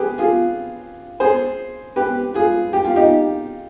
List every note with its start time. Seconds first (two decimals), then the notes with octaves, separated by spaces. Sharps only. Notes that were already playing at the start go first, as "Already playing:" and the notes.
Already playing: G4 G#4 B4
0.18 F4 G#4
1.20 G#4 C5
1.96 G4 B4
2.34 F4 G#4
2.73 G4
2.85 F4
2.96 D#4 G4